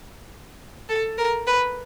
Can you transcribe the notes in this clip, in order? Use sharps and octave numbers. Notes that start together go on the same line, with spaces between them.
A4
A#4
B4